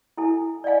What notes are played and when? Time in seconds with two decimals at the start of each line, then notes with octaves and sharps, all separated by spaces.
0.17 E4 A4 G#5
0.64 D5 D#5 F5 G#5